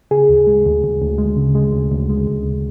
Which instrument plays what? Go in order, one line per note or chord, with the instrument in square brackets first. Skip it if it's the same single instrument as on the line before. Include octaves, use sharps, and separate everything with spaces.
[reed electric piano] C#3 G#4
D2
G#3
D2
D2
D2
G#3
C#3
G#3
D2
D2
G#3
D2
D2